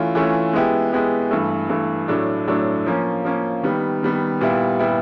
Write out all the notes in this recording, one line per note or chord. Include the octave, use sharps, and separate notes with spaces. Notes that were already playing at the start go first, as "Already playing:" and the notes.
Already playing: E3 A3 C#4 F4
E3 A3 C#4 F4
G#3 B3 E4 G4
G#3 B3 E4 G4
G2 E3 A3
G2 E3 A3
A2 F#3 A3 D4
A2 F#3 A3 D4
F3 A#3 C#4
F3 A#3 C#4
D#3 G3 B3
D#3 G3 B3
A#2 G3 B3 E4
A#2 G3 B3 E4